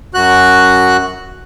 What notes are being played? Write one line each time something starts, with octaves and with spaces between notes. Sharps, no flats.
F#2 F#4 F#6